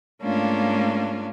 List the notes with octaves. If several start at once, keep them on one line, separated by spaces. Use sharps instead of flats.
G#2 A3 A#3 C#4 D4 F4